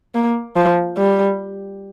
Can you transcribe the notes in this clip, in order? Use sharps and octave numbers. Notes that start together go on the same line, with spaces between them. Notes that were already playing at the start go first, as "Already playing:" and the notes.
A#3
F3
G3